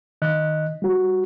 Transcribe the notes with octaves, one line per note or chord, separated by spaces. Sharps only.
D#3 D#5 F#6
G3 F#4